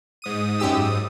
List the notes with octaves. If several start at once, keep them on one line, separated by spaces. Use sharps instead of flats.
G#2 D#6 D#7
F#2 G4 E6